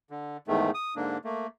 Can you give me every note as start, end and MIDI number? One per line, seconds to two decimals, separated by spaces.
0.10 0.37 50
0.48 0.71 40
0.48 0.71 44
0.48 0.71 51
0.48 0.71 57
0.74 0.94 87
0.96 1.18 44
0.96 1.18 50
0.96 1.18 58
0.96 1.18 62
1.24 1.47 57
1.24 1.47 58